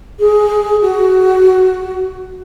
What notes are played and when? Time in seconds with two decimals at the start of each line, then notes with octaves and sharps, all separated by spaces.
0.19 G#4
0.81 F#4